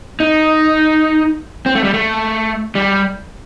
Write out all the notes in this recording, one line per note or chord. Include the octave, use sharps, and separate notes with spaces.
D#4
C4
A3
G3
A3
G3